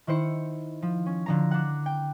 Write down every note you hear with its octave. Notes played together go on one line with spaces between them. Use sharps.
D#3 E4 C5 C#7
F3
C#4
D3 F3 A#5
D4 F#5
G5